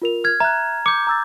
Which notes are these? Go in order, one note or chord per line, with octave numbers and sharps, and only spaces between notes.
F4 A#4 F7
F6 G#6
E5 A#5 F#6
D6 G6 C#7
A#5 E6 A6